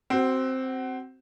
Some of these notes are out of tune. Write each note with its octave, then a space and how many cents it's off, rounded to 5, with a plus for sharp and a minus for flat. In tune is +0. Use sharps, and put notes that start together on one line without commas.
C4 +0 F#4 +30